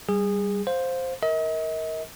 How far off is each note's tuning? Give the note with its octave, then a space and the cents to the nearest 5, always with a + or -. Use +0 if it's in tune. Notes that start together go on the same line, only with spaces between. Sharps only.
G3 +0 G#4 -20
C5 +0 F5 +15
A#4 +0 D#5 +40